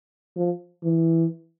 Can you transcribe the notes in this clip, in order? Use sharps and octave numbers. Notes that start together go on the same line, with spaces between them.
F3
E3